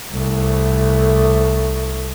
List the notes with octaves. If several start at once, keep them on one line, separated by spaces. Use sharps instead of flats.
C2 A3